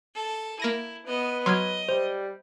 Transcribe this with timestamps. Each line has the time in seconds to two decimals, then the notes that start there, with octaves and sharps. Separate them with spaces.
0.15 A4
0.60 A#3 E4 A#6 D#7
1.06 B3 B4 D#5
1.46 F#3 D#5 C6 F6 G#6
1.89 G3 C5